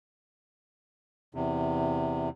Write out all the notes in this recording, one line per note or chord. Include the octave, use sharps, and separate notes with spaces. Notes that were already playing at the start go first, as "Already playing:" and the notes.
E2 C3